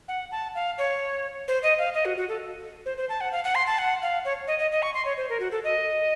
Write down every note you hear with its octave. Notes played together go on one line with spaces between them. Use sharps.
F#5
A5
F5
C#5
C5
D#5
F5
D#5
F#4
F#4
A4
C5
C5
A5
F#5
F5
F#5
C6
A5
F#5
F5
C#5
D#5
D#5
D#5
C#6
C6
C#5
C5
A#4
F#4
A4
D#5